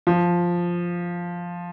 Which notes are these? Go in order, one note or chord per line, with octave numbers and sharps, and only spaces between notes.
F3